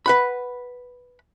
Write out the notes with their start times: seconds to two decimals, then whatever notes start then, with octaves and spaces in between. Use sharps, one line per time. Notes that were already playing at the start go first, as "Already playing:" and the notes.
0.06 B4 F#5 B5